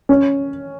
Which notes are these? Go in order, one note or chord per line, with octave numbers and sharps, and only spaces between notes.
C#4